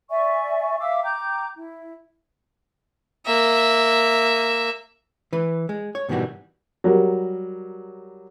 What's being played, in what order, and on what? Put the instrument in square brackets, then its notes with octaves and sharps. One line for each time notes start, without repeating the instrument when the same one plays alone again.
[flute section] D5 E5 G#5 C#6
E5 F5 D6 E6
G5 A#5 D6 G6
E4
[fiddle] A#3 E5
[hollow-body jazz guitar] E3 B4
G#3
C#5
G#2 B2 D#3 E3 G3 F#4
[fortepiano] F#3 G3 A#4